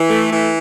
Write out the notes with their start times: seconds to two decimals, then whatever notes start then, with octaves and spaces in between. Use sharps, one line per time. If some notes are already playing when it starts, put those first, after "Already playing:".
Already playing: E3
0.09 A3
0.32 E3